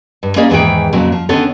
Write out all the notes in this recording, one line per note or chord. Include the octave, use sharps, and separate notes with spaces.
G2
A#3 C#4 E4 G#4 D5 D#5
E2 G#2 D#3 E3 G#4 G5
F2 A#2 C#3 F#3
F3
D3 D#3 B3 C#4 A4